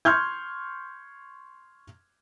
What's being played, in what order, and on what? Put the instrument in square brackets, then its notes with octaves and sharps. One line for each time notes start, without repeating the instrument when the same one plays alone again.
[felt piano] C6 C#6 F6 G6 G#6